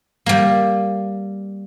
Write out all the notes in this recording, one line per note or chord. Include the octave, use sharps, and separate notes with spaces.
G3 A#3